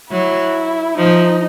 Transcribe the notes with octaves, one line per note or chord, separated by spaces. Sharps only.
F#3 E4
F3 D#4